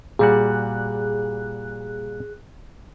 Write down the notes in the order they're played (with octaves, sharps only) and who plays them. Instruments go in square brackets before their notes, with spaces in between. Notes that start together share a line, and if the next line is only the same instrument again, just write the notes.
[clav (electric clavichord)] A#2 G3 F#4 [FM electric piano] G#4 F#6